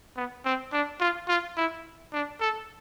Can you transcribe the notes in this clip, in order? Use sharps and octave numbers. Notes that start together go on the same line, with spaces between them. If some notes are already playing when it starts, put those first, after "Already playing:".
B3
C4
D4
F4
F4
E4
D4
A4